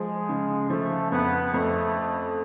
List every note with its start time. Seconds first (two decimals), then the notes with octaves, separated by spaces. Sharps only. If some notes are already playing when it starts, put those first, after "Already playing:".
Already playing: F3 G#3
0.29 C#3
0.70 F3 A3
1.12 F2 B3
1.54 F2 A3